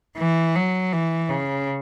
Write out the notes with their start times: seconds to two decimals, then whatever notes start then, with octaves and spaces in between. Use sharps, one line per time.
0.18 E3
0.56 F#3
0.93 E3
1.29 C#3